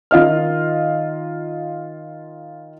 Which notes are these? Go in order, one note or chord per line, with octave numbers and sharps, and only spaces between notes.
D#3 F4 D#5 F6